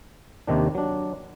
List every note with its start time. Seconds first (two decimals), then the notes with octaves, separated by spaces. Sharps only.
0.47 D#2 C3 D#3 D4
0.75 F#3 D4